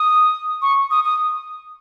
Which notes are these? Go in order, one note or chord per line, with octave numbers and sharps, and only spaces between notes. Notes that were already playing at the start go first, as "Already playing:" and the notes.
Already playing: D#6
C#6
D#6
D#6